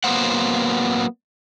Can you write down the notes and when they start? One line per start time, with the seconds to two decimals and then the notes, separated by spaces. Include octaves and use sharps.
0.04 F#3 A#3 B3 C5 F#5